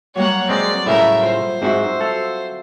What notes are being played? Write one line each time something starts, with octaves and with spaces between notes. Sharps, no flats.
F#3 G3 A#3 C#5 F#5
G#3 C4 D5
A2 C#3 A3 A#4 E5
F4 C5
G#2 C4 F#4 E5
A4 F5